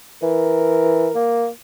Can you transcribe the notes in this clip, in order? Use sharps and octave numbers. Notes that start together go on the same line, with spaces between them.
E3 A#4
A#3